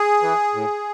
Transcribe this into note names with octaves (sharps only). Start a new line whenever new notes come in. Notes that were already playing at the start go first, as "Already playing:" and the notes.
Already playing: G#4
E3
A2